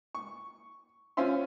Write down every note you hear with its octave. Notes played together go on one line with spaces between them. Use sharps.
C#6
C#4 F4 C5 E5 C6